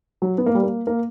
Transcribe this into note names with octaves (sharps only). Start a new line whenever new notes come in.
F#3
B3
A#3
G3
A#3
A#3